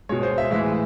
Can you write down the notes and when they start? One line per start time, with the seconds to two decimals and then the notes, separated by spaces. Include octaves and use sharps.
0.09 G#3 C#5
0.12 B2
0.23 C5
0.38 E5
0.51 A2 E3 G#3 E5